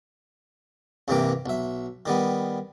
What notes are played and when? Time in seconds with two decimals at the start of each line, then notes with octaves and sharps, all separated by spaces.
1.08 C2 G2 C3 E3 A#3 G5
1.46 B1 E5
2.06 D#3 G3 B3